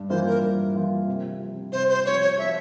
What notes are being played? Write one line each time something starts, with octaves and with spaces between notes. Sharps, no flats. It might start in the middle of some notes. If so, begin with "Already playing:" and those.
Already playing: G2
E3 A#3 F4 C5
A#4
G2
E3 A#3 F4
C3
F3 C4
C3 C5
C5
F3 C4 C#5
C#5
F3 E5